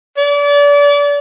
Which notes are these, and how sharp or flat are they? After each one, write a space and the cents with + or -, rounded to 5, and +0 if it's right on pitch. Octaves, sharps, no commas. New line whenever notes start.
D5 -35